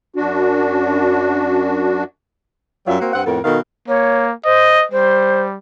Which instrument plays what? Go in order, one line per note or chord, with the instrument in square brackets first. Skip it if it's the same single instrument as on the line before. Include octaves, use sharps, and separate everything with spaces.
[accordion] F#2 D4 F#4
[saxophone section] F#2 F#3 G3 F4 E5
A#3 C4 F#4
G2 C4 F#5
F2 A2 B3 A4 A#4
B2 D#3 F#4 A4 F5
[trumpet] A#3 [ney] C#5
[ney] C5 [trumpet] D#5
[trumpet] G3 [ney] C5